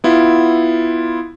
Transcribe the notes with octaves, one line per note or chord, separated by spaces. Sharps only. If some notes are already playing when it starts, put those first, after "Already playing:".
B3 E4 F4